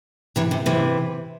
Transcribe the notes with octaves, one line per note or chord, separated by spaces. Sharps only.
C3 E3
C3
C3 E3